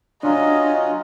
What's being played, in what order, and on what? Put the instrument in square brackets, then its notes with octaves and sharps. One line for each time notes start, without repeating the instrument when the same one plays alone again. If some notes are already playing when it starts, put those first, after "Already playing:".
[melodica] F#3 C#4 F4 [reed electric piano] D4 [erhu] D#5